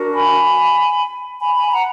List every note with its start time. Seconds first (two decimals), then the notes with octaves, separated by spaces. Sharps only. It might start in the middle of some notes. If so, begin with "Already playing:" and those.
Already playing: D4 F#4 A#4
0.13 G#5 B5
1.39 G#5 B5
1.55 G#5 B5
1.71 F#5 A#5